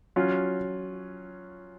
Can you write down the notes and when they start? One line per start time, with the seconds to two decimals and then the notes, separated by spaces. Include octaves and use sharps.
0.16 F#3 C#4 F4